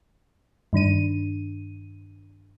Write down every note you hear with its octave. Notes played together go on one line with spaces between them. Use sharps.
G2 D#3 D4 D#7